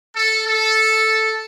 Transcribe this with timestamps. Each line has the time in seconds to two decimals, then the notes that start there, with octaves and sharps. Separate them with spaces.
0.14 A4
0.45 A4